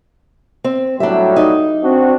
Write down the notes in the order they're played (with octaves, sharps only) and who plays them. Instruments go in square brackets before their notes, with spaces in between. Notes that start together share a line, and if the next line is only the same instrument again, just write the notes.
[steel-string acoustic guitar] C4
[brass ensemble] A2 F#3 G3 [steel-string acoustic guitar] D4 E5
[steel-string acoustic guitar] D#4
[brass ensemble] C4 D4 F#4